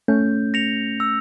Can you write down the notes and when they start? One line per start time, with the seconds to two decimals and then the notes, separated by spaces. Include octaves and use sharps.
0.08 A3 C#4 G6
0.54 A#6 C#7 F7
1.00 E6